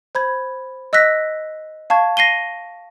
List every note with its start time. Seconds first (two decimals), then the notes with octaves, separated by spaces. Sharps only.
0.15 C5 B5 G#6
0.93 D#5 E6 F#6 A#6 B6
1.90 F5 A5 C#6 G#6
2.17 A#6 C7 D#7 G7